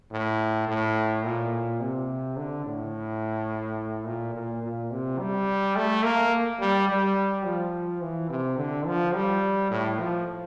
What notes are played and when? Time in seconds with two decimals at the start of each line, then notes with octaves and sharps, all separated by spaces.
0.12 A2
0.68 A2
1.24 A#2
1.81 C3
2.37 D3
2.65 A2
4.06 A#2
4.35 A#2
4.63 A#2
4.91 C3
5.19 G3
5.76 A3
6.04 A#3
6.60 G3
6.89 G3
7.45 F3
8.02 E3
8.30 C3
8.58 D3
8.86 F3
9.15 G3
9.71 A2
9.99 F3